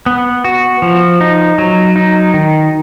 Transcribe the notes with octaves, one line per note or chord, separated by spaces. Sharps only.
B3
F#4
F3
D#4
F#3
D#4
D#3